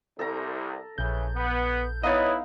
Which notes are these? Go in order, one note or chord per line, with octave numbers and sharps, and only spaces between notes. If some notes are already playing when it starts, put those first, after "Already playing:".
C2 A4 A#5
A#1 C#3 E3 G6
B3
B3 D#4 E4 B4 C#5 D#5 F5